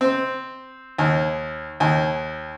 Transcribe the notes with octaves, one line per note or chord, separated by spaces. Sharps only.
C4
D#2
D#2